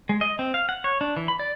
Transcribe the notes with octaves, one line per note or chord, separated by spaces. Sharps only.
G#3
D#5
C4
F5
F#5
C#5
D4
E3
B5
D5